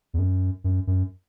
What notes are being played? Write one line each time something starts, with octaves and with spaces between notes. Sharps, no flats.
E2
F#2
F#2
F#2